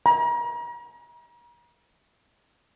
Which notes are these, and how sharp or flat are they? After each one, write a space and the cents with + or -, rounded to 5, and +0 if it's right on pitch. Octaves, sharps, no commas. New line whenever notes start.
A#5 +40